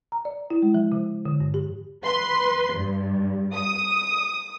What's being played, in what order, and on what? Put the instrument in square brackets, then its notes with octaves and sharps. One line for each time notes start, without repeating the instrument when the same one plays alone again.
[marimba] A#5
D5
E4
G#3
F3
C#3
D3
G2
G4
[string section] B4 C6
G2
D#6